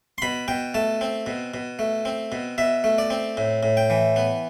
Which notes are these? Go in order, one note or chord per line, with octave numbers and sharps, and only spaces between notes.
C6
B2 B5
B2 G5
A3 A5
C4
B2
B2
A3
C4
B2
B2 E5
A3
D5
C4
A2
A2
G5
E3
B3